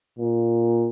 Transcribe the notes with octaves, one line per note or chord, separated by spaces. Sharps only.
A#2